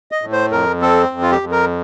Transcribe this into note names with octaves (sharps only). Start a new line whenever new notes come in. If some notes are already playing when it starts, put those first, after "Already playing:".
D#5
A2
C5
F2 A#4
C4 A4
F2
F4
G4
F2
A#4